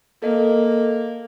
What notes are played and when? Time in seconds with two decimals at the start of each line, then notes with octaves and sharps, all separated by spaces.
0.22 A#3 A4 D#5